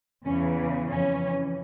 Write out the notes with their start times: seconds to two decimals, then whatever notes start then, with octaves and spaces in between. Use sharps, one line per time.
0.24 E2 C#3 E3 C#4
0.90 F2 E3 C#4